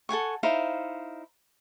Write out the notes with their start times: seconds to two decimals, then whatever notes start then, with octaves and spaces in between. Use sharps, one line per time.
0.09 A4 F#5 G#5 C#6
0.43 D#4 E4 C5 F5